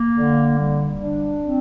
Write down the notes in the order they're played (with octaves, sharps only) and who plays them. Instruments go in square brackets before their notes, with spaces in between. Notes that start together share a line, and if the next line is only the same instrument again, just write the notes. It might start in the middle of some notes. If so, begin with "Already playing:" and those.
Already playing: [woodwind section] A#3
D3
G3
D4
C4